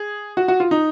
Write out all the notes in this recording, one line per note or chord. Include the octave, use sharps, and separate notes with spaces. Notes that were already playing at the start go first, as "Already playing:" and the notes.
Already playing: G#4
F#4
F#4
F4
D#4